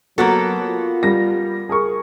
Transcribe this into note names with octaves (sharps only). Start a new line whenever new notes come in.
F#3 A#3 B3 F#4 A4
F4
G3 A#6
G#4 A#4 C#6